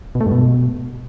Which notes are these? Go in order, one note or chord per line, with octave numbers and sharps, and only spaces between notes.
B2
A3
G2
B2